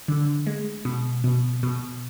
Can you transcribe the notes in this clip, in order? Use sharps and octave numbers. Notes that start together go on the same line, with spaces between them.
D3
G#3
B2
B2
B2